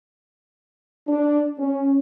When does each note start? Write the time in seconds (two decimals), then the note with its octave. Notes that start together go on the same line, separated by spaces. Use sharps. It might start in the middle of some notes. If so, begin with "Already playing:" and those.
1.08 D4
1.58 C#4